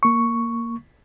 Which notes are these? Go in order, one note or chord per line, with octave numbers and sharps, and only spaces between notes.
A#3 C#6